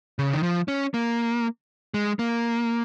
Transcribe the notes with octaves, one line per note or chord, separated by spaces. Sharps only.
C#3
D#3
F3
C#4
A#3
G#3
A#3